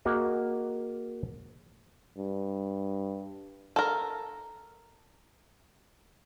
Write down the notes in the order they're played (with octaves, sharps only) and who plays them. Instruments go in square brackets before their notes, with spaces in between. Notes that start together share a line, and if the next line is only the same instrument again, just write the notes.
[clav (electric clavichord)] A#3 F#4 G#4 D#5
[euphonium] G2
[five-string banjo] A4 A#4